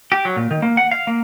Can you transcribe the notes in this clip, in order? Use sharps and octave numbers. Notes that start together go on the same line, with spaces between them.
G4
F#3
A#2
D#3
A#3
F#5
F5
A#3